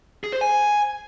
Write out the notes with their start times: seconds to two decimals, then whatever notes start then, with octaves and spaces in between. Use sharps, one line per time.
0.24 G#4
0.32 C5
0.41 G#5